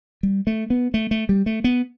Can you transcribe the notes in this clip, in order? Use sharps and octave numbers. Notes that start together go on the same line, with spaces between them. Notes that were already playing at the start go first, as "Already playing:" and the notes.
G3
A3
B3
A3
A3
G3
A3
B3